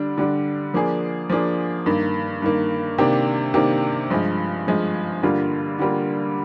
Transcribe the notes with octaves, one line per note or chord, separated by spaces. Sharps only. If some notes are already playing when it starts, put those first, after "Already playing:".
Already playing: D3 G3 D4
D3 G3 D4
F3 A#3 D4 G#4
F3 A#3 D4 G#4
G2 D#3 A#3
G2 D#3 A#3
C3 D#3 A#3 D4 G4
C3 D#3 A#3 D4 G4
G2 F3 G#3
G2 F3 G#3
G2 D3 G3 A#3 F4
D3 G3 A#3 F4